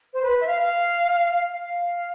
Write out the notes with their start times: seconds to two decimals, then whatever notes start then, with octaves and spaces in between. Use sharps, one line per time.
0.13 C5
0.22 B4
0.41 E5
0.47 F5
0.58 F5
1.31 F5
1.48 F5